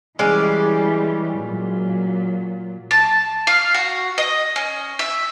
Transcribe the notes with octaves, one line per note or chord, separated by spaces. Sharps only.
E3 G3 G#3 C#4 D5
A#2 F#3
A5
F5
F#4
D#5
C#4
E5